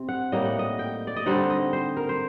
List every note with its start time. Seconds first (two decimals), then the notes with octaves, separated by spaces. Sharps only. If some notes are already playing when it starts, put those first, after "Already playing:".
Already playing: C3 C4
0.09 F#5
0.32 A2 G3 A#3 D#4 D#5
0.45 F#5
0.59 D#5
0.79 G5
1.07 D5
1.16 D#5
1.26 D3 G3 C4 D#4 F#5
1.50 D#5
1.73 C5
1.97 A#4
2.09 C5